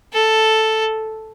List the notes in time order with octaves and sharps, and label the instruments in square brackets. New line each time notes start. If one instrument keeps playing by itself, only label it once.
[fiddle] A4